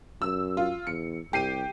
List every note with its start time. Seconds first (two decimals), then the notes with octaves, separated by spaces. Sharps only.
0.22 F#2 E6
0.57 F4
0.87 E2 C#7
1.33 C2 G4 C7 D#7